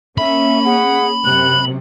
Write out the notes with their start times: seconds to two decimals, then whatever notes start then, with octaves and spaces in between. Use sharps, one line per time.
0.18 A#3 C#4 E5 B5
0.65 G#4 F#5
1.25 F#2 C3 F#6 F#7